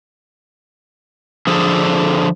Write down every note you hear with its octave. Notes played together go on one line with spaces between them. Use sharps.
D3 F3 G#4 A4